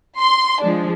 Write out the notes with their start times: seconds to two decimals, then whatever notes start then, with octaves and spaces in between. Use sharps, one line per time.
0.19 C6
0.62 F3 G#3 D4